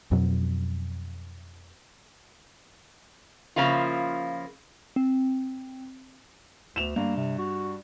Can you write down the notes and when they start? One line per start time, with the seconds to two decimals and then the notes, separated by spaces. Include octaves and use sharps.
0.11 F2 B2 F#3
3.56 C#3 F3 A#3 E4 F4
4.96 C4
6.76 D2 E7 F7
6.96 G2 A#3
7.17 C3
7.39 F#4